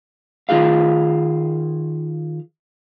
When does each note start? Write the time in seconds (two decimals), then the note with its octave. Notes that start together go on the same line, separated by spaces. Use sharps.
0.49 D#3 F4 G#4 F5